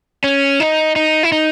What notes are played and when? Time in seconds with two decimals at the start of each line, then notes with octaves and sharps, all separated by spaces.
0.24 C#4
0.60 D#4
0.96 D#4
1.23 E4
1.32 D#4